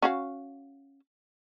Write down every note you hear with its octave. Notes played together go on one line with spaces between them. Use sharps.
C#4 F#4 F5